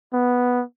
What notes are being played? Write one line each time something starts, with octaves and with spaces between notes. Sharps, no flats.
B3